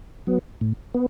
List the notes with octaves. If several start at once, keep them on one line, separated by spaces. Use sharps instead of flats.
F#3 B3
A2
B3